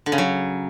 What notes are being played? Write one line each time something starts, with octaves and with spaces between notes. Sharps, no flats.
D3
C#3
F#3